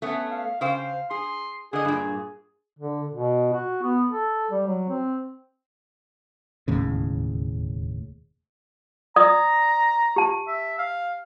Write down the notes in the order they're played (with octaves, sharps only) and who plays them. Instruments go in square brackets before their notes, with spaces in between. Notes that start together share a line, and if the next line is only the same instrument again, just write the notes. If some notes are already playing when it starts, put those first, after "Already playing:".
[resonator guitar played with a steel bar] A3 B3 C#4
[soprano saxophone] F5
[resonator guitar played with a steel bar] C#3 C5 G5 [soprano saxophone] F5
[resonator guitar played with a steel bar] G#4 [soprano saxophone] C6
[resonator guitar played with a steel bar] D3 D#5 [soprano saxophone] G#4
[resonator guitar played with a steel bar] G2 A#2
[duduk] D3
B2
F#4
B3
A4
G3
F#3
C4
[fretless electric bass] E1 D#2 A2 C#3
[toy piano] D5 D#6 [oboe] A#5
[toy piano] G4 A5
[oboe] E5
F5